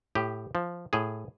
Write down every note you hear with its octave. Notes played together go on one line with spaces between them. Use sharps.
A2 G4
F3
A2 G#4